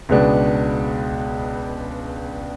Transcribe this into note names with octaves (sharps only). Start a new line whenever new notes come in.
C#2 B2 G#3 B3 D4